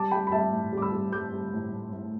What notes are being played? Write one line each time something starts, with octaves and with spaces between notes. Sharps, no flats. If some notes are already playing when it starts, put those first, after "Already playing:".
Already playing: G3 A5 D6
G3 G5 B5
B5
G3 E5 A5
A2
G3 D6
B5 E6
G3
G3 D6 G6
G3
A2
A2
A2